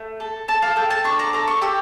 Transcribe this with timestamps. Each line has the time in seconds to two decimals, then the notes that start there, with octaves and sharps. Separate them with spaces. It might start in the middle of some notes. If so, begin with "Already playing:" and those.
Already playing: A3
0.20 A4
0.48 A4 A5
0.62 F5
0.76 A4 G5
0.90 A5
1.04 D4 C#6
1.19 A#5
1.33 A4 A#5
1.48 C#6
1.62 G4 E6